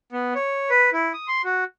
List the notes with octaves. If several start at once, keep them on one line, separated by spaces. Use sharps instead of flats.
B3
C#5
B4
E4
D#6
C6
F#4